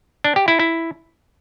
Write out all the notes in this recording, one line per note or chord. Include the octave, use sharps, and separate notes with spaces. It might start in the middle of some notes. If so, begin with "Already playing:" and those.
D4
G4
E4
E4